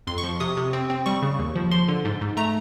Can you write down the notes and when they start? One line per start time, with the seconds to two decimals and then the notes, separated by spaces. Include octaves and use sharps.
0.07 F2 C6
0.18 C#6
0.23 F3
0.40 C3 D#6
0.57 C3
0.73 C4
0.90 C4
1.06 G3 C#6
1.22 C#3
1.39 D#2
1.55 F3
1.71 F3 C6
1.88 D3
2.05 G#2
2.21 G#2
2.37 A3 A#5